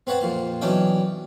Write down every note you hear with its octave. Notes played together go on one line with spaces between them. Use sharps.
C4 B4 C#5 F#5 A5
F2 A#2 C5
B1 E3 C#4 D4 D#5 G5